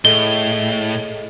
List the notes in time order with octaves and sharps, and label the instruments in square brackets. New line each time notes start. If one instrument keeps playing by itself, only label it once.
[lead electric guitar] A2 [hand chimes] G#4 A4 D#5 [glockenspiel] G7